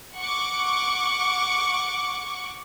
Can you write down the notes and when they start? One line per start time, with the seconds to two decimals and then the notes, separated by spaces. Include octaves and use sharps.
0.17 F#5 C#6 D6